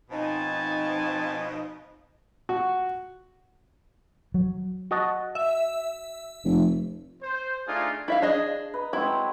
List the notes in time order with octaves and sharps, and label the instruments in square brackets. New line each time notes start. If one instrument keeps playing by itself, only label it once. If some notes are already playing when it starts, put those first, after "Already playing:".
[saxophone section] B2 F3 D#4 [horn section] C4 G#5 A5
[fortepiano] F#4
[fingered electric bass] F#3
[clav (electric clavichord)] F#4 D#5 A5
[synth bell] E5
[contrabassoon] F1
[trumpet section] C5
A3 D4 D#4 F4 G#4
[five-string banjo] E4 E5 F5
D4 G#4 D#5
[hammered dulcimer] B4 D#5 A#5
[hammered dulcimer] F#3 G#3 C4 [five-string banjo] E4